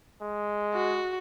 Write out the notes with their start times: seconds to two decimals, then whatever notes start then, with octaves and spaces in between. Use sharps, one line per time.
0.21 G#3
0.74 F#4